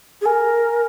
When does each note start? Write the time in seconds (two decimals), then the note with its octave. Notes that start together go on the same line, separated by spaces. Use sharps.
0.21 G#4
0.26 A#4 G#5